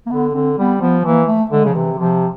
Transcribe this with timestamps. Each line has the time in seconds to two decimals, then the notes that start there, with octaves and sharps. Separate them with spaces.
0.06 A#3
0.11 D3 B3
0.34 D3 C4
0.58 G3 B3
0.81 F3 B3
1.05 E3 A#3
1.28 A3
1.51 D3 G#3
1.65 C#3 F3
1.74 C3 E3
1.98 C3 F3